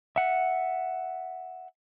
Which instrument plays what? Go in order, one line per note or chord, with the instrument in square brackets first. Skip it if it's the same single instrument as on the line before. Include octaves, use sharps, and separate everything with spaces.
[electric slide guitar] E5 F#5